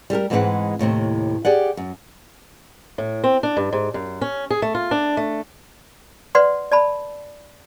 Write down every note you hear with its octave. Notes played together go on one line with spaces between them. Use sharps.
G3 G4 A4 A#4
G#2 E3 G#3 C4 B4 F#5
D#2 A2 C3 C4
G4 G#4 D5 F#5
F#2
A2
C4
D4
G2
G#2
F#2
C#4
G#4
A3
F4
D4
A3
B4 D5 F#5 C6
D5 A5 B5